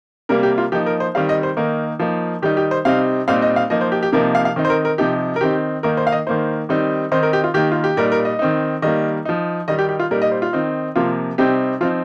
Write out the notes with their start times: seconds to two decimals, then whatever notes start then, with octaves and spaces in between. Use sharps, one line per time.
0.29 C3 G3 A#3 A#4
0.43 G4
0.58 F4
0.72 F3 A#3 D#4 G4
0.86 A#4
1.00 C5
1.15 D#3 G3 C4 F5
1.29 D#5
1.43 C5
1.57 D#3 A#3 D#4 A#4
1.99 F3 A#3 D#4
2.42 D#3 G3 D#4 G4
2.57 G4
2.71 C5
2.85 C3 G3 C4 D#4 F5
3.28 A#2 G3 C4 D#4 F5
3.42 D#5
3.56 F5
3.70 F3 A#3 D#4 D#5
3.81 C5
3.92 G4
4.03 G4
4.13 C3 F3 A#3 D#4 A#4
4.35 F5
4.45 F5
4.56 D#3 C4 D#4
4.65 C5
4.70 A#4
4.85 A#4
4.98 C3 F3 D#4 G4
5.36 A#4
5.41 D#3 C4 D#4 G4
5.83 D#3 A#3 D#4 A#4
5.97 C5
6.07 F5
6.12 D#5
6.27 D#3 A#3 D#4 C5
6.69 D#3 G3 C4 D#4
7.12 D#3 C4 D#4 C5
7.23 A#4
7.33 G4
7.44 F4
7.54 D#3 A#3 D#4 G4
7.72 F4
7.84 G4
7.97 A#2 G3 D#4 A#4
8.12 A#4
8.25 D#5
8.39 D#3 C4 D#4
8.82 D#3 G3 A#3 D#5
9.25 F3 D#4
9.68 D#3 G3 D#4 D#5
9.79 G4
9.89 G4
10.00 F4
10.11 A#2 G3 D#4 A#4
10.22 D#5
10.31 C5
10.42 F4
10.53 D#3 C4 D#4
10.96 C3 F3 A#3 F4
11.38 C3 G3 C4 D#4 G4
11.81 F3 C4 D#4 F4